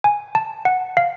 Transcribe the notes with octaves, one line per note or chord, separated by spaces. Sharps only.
G#5
A5
F#5
F5